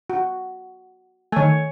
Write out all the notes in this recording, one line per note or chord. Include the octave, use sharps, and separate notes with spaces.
F#4
D#3 A3 C#5 G#5